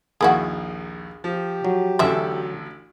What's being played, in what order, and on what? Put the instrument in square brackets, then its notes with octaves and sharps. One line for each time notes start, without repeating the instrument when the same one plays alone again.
[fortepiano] A#1 D#2 [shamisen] A#3 E4 F#4 [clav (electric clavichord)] G#4
[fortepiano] F3 [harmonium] G4
[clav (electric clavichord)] F#3
[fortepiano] A1 D2 A4 [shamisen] C#4 D4 E5